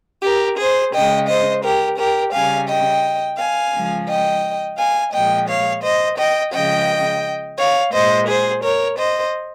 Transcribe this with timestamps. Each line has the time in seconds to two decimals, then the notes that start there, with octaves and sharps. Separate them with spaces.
0.23 G4 A#4
0.58 G#4 C5
0.93 C#3 G#3 D#5 G5
1.28 C5 D#5
1.64 G4 A#4
1.98 G4 A#4
2.33 C#3 G3 F5 G#5
2.69 D#5 G5
3.38 F5 G#5
3.73 C#3 F3 G#3
4.08 D#5 G5
4.78 F5 G#5
5.13 A#2 F3 G#3 D#5 G5
5.48 C#5 F5
5.83 C5 D#5
6.18 D#5 G5
6.53 C#3 F3 G#3 D#5 G5
7.57 C#5 F5
7.92 A#2 G#3 C5 D#5
8.27 G#4 C5
8.63 A#4 C#5
8.98 C5 D#5